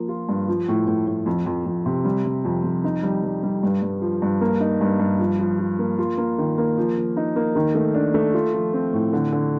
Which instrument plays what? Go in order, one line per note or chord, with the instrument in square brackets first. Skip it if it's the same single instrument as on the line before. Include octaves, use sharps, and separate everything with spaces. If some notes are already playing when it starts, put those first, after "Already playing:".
Already playing: [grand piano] F3 A#3
F4
G2
F3
A2
A2
A2
F2
F2
F2
C3
G3
G3
F2
F2
D#4
G3
G3
G3
G2
G2
F3
G2
A#3
D#4
G2
G2
F3
F3
F3
A#3
F4
A#3
D#3
A#3
F3
F3
D#4
A#3
D#3
A3
D4
A3
F4
F3
C4
A2
D3
D3